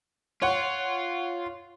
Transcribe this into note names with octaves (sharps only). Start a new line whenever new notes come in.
F4 C#5 F#5